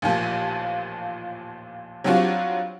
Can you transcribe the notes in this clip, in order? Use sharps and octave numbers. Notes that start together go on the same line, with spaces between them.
A1 D#2 A#2 F3
F#3 G3 C4 D4 F4 F#4